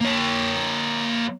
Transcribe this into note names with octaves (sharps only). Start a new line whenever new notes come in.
A#3 C#5